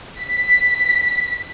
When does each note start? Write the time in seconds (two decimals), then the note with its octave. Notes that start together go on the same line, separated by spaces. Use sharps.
0.21 B6